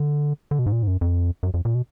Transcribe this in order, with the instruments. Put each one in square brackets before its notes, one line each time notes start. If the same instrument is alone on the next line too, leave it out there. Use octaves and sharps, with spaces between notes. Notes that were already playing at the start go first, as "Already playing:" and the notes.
Already playing: [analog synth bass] D3
D3
B2
G#2
A#2
G#2
F#2
F2
F#2
F2
A#2
B2